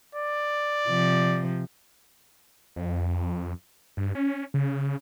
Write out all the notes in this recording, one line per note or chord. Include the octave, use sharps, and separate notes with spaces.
D5
C3 F3
F2
G2
C#4
C#3